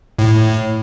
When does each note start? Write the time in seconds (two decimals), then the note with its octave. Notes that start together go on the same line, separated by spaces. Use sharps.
0.19 A2